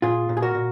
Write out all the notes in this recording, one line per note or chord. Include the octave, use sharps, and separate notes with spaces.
A#2 F4 G#4
A#2
G#4
F#4 A#4
A#2